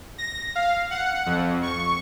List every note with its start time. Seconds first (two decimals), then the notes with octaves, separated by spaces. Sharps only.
0.18 A#6
0.55 F5
0.91 F#5
1.26 F2
1.62 C#6